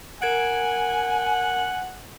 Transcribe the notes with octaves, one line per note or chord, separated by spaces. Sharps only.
A#4 F#5 G#5 G#6 D7